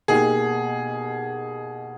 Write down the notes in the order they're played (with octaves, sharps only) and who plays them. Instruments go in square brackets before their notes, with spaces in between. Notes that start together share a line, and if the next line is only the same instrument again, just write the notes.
[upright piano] B2 A#3 D#4 G4 [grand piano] G#4